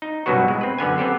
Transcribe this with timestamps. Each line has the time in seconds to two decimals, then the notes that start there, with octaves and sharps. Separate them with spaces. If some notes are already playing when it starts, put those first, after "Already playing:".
0.02 D#4
0.26 C2 G2 B2 F#3 B3 F#4
0.48 G#3
0.61 C4 B4
0.78 F#2 D3 B3 G#5
0.98 B3 C4 G4 A4